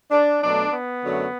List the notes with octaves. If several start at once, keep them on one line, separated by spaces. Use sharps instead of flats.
D4
B2 F#3 A3 D4
B3
F#2 D3 F#3 A3